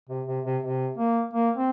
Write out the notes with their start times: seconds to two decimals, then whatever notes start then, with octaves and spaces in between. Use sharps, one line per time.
0.09 C3
0.27 C3
0.45 C3
0.63 C3
0.98 A#3
1.33 A#3
1.57 C4